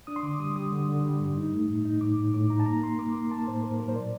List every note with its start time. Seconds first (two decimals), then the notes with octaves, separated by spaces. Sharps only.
0.07 D4 D#6
0.16 C6
0.23 D3 D6
0.40 G3 D#6
0.56 G3 D#6
0.72 D3
0.89 D3
1.05 G3
1.20 G2
1.37 D#4
1.53 A3
1.69 A2
1.85 D#4
2.01 A2 D6
2.18 A2
2.34 A2 D6
2.50 D#4 A#5
2.60 A5
2.66 A#3 A#5
2.82 A#3 C6
2.99 A#3 D6
3.15 A#3 C6
3.31 A#3 A5
3.48 A2 C5
3.64 A#3 A#4
3.80 F#3 A#4
3.88 C5
3.96 A#2 D5